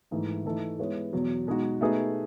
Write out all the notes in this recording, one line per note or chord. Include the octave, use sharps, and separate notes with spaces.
G#2 E3 A3 D#4
E3 A3 D#4 A4
G#3 B3 E4 G#4 C#5
E2 B2 F#3
B2 G#3 D#4 F#4
B2 A3 D#4 G#4 B4